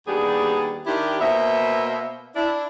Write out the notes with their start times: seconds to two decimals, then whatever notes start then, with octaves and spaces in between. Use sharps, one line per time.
0.06 D#2 G3 B3 D4 G4 G#4
0.86 D#3 D4 E4 G4
1.20 B2 A#3 B3 C5 E5
2.36 D4 E4